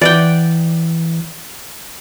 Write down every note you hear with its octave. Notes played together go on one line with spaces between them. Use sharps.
E3 D5 F#5 G5